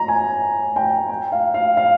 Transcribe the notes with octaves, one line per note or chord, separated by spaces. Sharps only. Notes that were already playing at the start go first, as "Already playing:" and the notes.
Already playing: A#5
G#5
G5
G5
F5
F5
F5